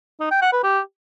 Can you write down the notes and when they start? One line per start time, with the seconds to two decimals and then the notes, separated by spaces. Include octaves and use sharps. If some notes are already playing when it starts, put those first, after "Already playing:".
0.20 D#4
0.31 G5
0.42 F#5
0.53 B4
0.63 G4